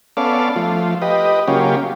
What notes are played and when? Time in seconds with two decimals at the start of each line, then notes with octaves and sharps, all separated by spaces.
0.17 B3 C#4 A4 D5 F5
0.56 F3 A3 F4
1.02 G4 B4 D#5
1.48 C#3 F#3 A#3 C#4 F4 G4